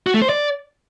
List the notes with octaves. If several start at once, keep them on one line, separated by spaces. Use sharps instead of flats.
F#4
A3
C5
D5